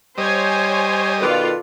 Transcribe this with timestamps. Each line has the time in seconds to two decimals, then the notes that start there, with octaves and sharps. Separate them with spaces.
0.18 G3 C5 C#5 D#5 G#5
1.21 B2 D#3 F4 A4 B4 D5